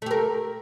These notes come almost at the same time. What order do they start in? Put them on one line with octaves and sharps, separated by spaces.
A3 G4 A#4